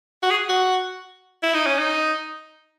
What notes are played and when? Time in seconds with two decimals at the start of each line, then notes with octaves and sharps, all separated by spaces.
0.23 F#4
0.30 G#4
0.49 F#4
1.43 E4
1.54 D#4
1.66 C#4
1.79 D#4